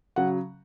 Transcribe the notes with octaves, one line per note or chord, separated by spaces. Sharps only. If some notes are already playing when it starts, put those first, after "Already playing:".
C#3 F#3 F#5